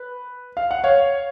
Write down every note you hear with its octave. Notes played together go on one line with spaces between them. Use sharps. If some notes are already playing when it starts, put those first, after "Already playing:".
Already playing: B4
F5
F#5
C#5 F5